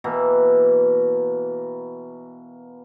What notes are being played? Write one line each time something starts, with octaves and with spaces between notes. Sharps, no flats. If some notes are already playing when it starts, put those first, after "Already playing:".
B2 E3 A#3